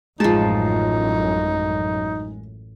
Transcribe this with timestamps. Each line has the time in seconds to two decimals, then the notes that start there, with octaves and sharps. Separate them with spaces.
0.20 A1 F#2 F3 G#3 D#4 A5